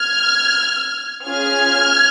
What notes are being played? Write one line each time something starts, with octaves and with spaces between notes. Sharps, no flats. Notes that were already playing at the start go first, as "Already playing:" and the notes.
Already playing: F6 G#6
C#4 F4 G#4 F6 G#6